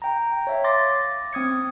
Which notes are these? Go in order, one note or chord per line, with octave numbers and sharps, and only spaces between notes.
G5 A#5
C#5 E5 F5
C6 D6 A6 A#6
C4 D#6 G#6 C#7